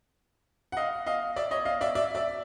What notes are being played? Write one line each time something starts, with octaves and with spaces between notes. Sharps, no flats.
F#5
D#5 F5
D#5 F5
D5 E5
C#5 D#5
D#5 F5
D5 E5
D5 E5
D5 E5